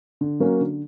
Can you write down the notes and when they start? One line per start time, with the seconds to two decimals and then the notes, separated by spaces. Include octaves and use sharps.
0.21 D3
0.40 F#3 A#3 C#4 F#4
0.61 D3